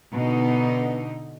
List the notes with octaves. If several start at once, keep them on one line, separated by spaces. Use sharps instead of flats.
B2 D3 B3 D#4